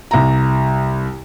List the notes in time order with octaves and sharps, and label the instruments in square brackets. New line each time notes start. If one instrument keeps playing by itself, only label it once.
[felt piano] C2 A#5